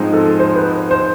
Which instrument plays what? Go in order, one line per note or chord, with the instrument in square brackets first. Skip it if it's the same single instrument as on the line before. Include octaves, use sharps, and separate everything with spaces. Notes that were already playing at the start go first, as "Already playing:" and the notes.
Already playing: [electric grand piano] G#2 F3 G#3 C4 D#4
[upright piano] A4
C5
B4
C5